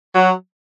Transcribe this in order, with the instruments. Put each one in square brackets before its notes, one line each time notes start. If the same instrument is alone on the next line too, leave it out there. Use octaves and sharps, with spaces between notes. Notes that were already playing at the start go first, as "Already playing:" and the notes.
[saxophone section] F#3